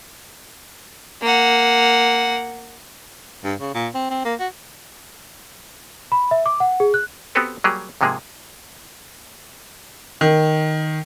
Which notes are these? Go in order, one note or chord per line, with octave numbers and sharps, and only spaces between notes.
A#3 F#5
G2
C#3
A#2
C4
C4
A#3
F#4
B5
E5
D6
F#5
G#4
F#6
B3 C4 F#4 G4 A4 B4
F#3 G3 A#3 G4 G#4
G#2 C3 F3 G#3 A#3 G#4
D#3